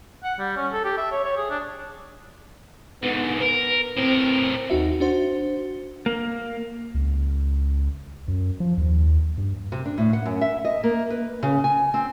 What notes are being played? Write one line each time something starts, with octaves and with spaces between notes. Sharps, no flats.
F#5
G3
C#4
A4
G4
E5
C#5
C#5
G#4
D4
G#2 D3 B3
A#4 B4
A2 C4 A#4
D#2 D#4 F#4 E5
D4 F#4 C5
A#3
C#2
F#2
F3
D#2
G2
C3
D4
A2
F#5
F#2
E5
D#5
A#3
B4
C#3
G#5
C4